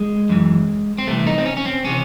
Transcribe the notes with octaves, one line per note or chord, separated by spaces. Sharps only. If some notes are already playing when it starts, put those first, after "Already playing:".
Already playing: G#3
F#2 E3
C4
C2 C3 E3 A3
D#4
C4
C#4
C#4
C4
C3 E3 C#4